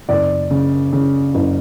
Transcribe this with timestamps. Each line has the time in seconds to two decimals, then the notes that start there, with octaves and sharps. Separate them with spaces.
0.09 F#1 D5
0.50 C#3
0.93 C#3
1.34 F#1